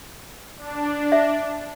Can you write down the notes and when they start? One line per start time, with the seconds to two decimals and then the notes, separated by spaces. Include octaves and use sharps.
0.58 D4
1.12 E5